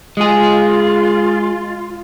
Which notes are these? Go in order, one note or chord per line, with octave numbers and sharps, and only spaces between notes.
G#3 F4 G#4